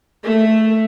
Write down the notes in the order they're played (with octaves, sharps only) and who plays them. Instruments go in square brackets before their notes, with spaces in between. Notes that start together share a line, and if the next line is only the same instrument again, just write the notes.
[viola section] A3